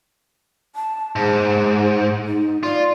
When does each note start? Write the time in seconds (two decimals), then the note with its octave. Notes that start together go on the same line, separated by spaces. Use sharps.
0.76 A5
1.16 G#2 G#4
2.26 D#4
2.63 F4 D5